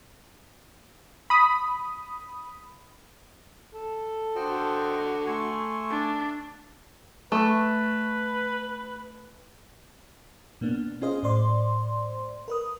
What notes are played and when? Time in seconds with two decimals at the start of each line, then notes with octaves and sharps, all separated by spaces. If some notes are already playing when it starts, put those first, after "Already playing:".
1.30 B5 D#6
3.74 A4
4.35 D3 F#4 C5 D#5 G5
5.26 A3 G#5 C6 C#6
5.91 D4
7.32 A3 B4
10.61 B2 A#3 B3 D4
11.02 C#4 F4 G#4 C5 D#5 F5
11.23 A2 C5 D5 C6
12.48 A#4 B4 D#6